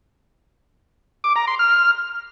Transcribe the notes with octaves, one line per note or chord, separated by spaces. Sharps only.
D6
A#5
C6
F6